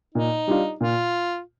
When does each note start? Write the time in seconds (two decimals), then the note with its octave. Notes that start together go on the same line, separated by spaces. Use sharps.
0.14 A#2 D#4
0.47 G3 D4 F4
0.80 A#2 F4